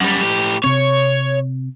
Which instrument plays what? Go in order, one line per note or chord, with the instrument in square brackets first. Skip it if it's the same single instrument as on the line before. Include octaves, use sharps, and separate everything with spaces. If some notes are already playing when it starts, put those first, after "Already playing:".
[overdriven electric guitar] F#2 G3
A2 G4
[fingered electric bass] C3 C4 [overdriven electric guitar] C#5